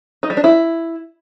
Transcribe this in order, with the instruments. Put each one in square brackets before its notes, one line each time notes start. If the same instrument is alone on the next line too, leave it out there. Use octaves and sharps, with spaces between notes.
[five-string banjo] D#4
G3
D4
E4